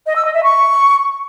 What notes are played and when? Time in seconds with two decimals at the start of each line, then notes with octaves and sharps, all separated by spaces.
0.06 D#5
0.15 E6
0.24 D#5
0.34 E5
0.43 C#6